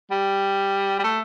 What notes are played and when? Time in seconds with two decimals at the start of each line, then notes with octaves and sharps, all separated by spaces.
0.11 G3
0.99 G3
1.04 A3